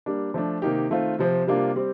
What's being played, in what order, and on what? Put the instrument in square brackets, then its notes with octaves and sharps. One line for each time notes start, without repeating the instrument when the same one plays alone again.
[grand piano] G3 A#3 D4
F3 A3 D4
C3 D#3 A#3 D#4 G4
D#3 A3 C4 F4
C3 F3 C4
C3 G3 A#3 D4 F4
G3 C4 G4